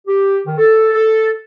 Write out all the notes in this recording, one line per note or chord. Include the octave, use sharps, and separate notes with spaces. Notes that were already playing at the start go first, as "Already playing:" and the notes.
G4
D#3
A4
A4